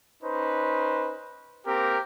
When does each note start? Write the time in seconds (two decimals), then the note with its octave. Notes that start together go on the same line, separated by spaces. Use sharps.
0.23 C#4 D#4 B4 C5
1.67 A#3 C4 G4 A#4